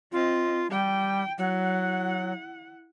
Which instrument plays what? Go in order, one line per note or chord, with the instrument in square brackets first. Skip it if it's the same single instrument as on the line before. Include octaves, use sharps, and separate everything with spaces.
[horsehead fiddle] C4 D#5 [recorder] F4
[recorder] G3 [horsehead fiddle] G5
[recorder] F#3 [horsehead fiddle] E4 F#5